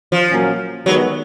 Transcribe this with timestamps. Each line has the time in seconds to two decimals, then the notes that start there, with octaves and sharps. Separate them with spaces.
0.12 F3
0.30 A#2 F#3 A#3 C#4
0.86 D#3 F#3 G#3 B3